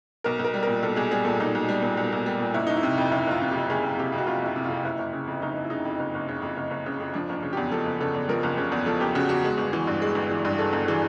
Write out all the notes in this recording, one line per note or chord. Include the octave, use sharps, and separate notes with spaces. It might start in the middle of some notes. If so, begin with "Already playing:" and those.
B1 A#4
B1
A#4
G3
A#2 A#4
B1 A4
B1 G#4
G3 G#4
A#2 A4
B1 D#4
B1
G3
A#2
B1
B1
G3
A#2
F#1 E4
F#1 D#4
E4
C3
F2
F#1 E4
F#1 F4
C3
F2 G4
F#1 G#4
F#1
C3 G4
F2
F#4
F#1 F4
F#1 E4
C3
F2 F4
F#1 E4
F#1
C#3
F2
F#1 D#4
F#1
E4
C#3 D#4
F2
F#1
F#1
C#3
F2
F#1
F#1
C#3
F2
F3 D4
F#1 D4
C#3
E2 G4
F3 A4
F#1
C#3 A4
E2
F3 A#4
F#1
C#3
E2
F3 A4
F#1 G4
C#3 F#4
E2 F#4
G#3
G1
E3
G2
G#3
G1
E3
G2
G#3 A4
G1
E3 G#4